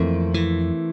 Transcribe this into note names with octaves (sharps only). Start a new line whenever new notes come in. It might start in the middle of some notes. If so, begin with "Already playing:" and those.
Already playing: F2 E3 A3 A#3 C4
E3